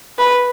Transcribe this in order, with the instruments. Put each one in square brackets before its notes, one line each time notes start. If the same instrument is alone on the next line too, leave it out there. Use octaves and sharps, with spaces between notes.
[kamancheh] B4